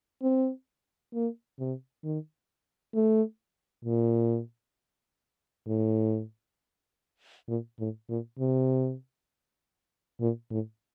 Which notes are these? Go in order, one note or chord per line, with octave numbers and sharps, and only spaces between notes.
C4
A#3
C3
D#3
A3
A#2
A2
A#2
A2
A#2
C3
A#2
A2